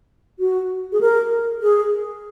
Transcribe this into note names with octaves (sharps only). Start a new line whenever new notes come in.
F#4
G#4
A#4
G#4